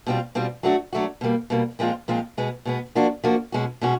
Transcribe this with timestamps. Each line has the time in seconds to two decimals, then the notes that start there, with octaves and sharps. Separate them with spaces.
0.07 B2 G3 C4 F4
0.35 B2 G3 C4 F4
0.63 F#3 A3 D4 F#4
0.93 F#3 A3 D4 F#4
1.21 B2 G3 A#3
1.50 B2 G3 A#3
1.79 A#2 F3 G#3 C4 F4
2.08 A#2 F3 G#3 C4 F4
2.37 B2 G#3 B3
2.65 B2 G#3 B3
2.95 F3 A#3 D4 F#4
3.24 F3 A#3 D4 F#4
3.52 B2 G#3 C#4 F#4
3.81 B2 G#3 C#4 F#4